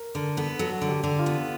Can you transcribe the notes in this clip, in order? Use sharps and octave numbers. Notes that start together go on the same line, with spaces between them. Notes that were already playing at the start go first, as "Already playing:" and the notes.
Already playing: A#4
D3 A#4
B3 A4
F#3 A4
D3
G4
D3
F4
B3